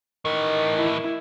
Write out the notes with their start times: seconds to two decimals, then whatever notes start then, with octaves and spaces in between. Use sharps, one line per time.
0.25 A2 D#3 E3
0.78 E4